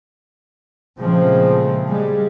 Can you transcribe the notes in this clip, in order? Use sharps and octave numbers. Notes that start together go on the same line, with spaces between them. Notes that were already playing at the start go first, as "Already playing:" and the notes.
A#2 C#3 F3 G#3 A3 C4
G3 G#3